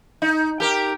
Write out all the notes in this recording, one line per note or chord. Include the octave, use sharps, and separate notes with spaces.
D#4
G4 A#4